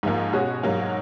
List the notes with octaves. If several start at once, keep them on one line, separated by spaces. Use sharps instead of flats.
G#2 F3 A#3
B2 G#3 C#4 F#4
G#2 F#3 A#3